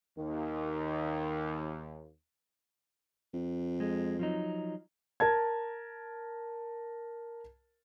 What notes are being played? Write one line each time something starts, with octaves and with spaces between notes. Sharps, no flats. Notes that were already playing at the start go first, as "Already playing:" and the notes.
D#2 D#3
F2
G#3
F3 F#3 D#4
A#4 A5 G#6